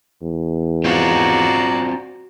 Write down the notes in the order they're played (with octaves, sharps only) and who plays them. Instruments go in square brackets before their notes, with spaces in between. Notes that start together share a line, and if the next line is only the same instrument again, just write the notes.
[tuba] E2
[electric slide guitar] C4 C#4 F4 [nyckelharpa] F#4 D5 [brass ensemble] A#5